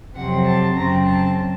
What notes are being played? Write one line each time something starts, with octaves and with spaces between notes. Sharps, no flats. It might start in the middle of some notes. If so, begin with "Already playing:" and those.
F2 C3 F#3 C4 F#5
A5
F#2 C#3 F#3 C4 A#5
A5